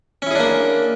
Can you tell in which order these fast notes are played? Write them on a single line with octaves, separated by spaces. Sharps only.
C#4 E4 G#4 D4 A#3